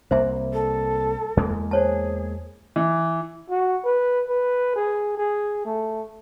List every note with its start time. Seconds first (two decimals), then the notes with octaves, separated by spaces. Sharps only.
0.11 C2 A#3 C5 E5
0.53 A4
1.37 E2 G#3 A#3
1.71 G#4 C5 C#5 A5
2.76 E3
3.50 F#4
3.85 B4
4.28 B4
4.76 G#4
5.18 G#4
5.65 A3